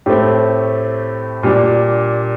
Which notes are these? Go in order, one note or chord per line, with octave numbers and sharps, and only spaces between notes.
A2 A3 C4 G4
A#2 G3 D4